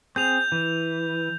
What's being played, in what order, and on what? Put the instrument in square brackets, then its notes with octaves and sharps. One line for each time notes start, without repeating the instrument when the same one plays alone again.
[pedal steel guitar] C4 G#4 [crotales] G6 F7
[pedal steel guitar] E3